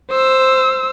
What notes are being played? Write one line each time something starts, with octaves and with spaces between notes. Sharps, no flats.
C5 E6